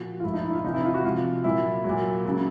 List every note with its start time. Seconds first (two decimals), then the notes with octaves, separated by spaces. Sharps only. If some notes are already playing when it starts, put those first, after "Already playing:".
Already playing: A#2 F3 F#4
0.20 F4
0.24 A2 F3 E4
0.34 D#4
0.44 E4
0.55 F4
0.64 C3 E3 D#4
0.74 E4
0.85 F4
0.94 F#4
1.04 C3 F3 F4
1.44 A#2 F#3 E4
1.84 A#2 F#3
2.25 C#3 F#3